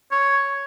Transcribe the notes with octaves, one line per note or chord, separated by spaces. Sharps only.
C#5